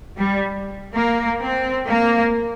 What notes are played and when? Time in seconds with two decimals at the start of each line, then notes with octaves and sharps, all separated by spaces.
0.17 G3
0.94 A#3
1.40 C4
1.87 A#3